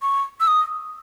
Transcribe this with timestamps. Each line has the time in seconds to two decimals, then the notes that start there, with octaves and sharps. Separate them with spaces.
0.02 C#6
0.40 E6
0.47 D#6